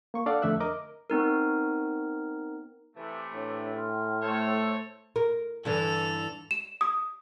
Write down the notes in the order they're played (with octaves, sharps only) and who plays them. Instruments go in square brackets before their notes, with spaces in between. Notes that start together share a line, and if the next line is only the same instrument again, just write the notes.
[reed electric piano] A#3 C#6
D4 A4 D5 F5 F#5
F2 D3 A3 E5 E6 F#6
A#4 D#5 D6
[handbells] B3 C4 D#4 A#4
[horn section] C3 E3 A3
[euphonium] A2 [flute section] D4 C#5
[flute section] G#5 C6 F6
[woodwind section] A3 [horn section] A4 C5 C#5
[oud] A#4
[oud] G2 D3 E3 [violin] A4 F7
[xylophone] E7
D#6